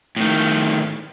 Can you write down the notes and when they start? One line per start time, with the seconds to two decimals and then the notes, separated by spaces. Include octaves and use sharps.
0.16 A2 D#3